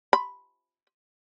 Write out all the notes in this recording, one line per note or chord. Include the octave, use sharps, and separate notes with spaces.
B5